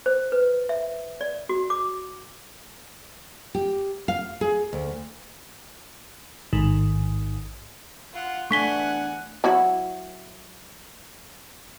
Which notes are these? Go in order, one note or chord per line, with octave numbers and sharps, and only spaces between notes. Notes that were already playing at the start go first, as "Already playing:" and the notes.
C5
B4
E5
D5
F#4
D6
G4
F5
G#4
D2
A1 G#2 D#3
F4 F#5
E2 A3 D4 F#5 G#5 C#6 B6 G7
F#3 E4 F#4